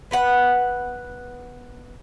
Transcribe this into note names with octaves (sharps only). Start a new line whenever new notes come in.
B3 B4 F#5